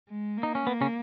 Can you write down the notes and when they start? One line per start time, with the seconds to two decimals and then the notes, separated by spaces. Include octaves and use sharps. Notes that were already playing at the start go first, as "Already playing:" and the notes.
0.08 G#3
0.37 A#3
0.43 D#4
0.55 C#4
0.67 A#3 B3
0.81 C#3 C#4